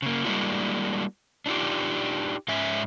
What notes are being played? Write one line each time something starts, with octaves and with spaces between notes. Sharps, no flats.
C#3 A#3
G3 G#3 A#3 D4 E4 F#4
D4 D#4 F4 G4
G#2 C#4 E5 G#5